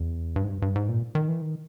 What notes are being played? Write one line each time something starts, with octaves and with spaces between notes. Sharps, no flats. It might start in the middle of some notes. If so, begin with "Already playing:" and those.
Already playing: E2
G2
G#2
G2
G2
G#2
A#2
D#3
E3
D#3